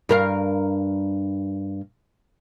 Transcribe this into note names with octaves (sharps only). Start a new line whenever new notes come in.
G2 A#4 F5